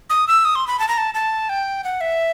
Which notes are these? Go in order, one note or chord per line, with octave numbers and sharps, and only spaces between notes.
D#6
E6
D#6
C6
B5
A5
A#5
A5
A5
G5
F#5
E5